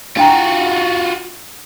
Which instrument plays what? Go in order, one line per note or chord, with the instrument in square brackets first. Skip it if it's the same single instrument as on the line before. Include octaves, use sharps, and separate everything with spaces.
[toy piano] D4 G5 A#5 [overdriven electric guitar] F4 F#4